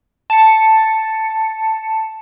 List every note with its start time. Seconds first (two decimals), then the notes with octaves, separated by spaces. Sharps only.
0.30 A5 C#7